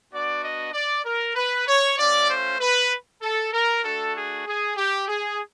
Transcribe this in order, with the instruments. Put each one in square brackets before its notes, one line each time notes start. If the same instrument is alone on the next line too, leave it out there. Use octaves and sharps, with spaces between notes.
[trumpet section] B3 D4 F#4 D5
D#5
D5
A#4
B4
C#5
A3 C#4 F4 D5
C5
B4
A4
A#4
A3 D4 F#4 A4
G#4
G#4
G4
G#4